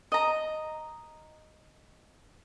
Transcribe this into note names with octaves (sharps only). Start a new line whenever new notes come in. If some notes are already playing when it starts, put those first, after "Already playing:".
D#5 A#5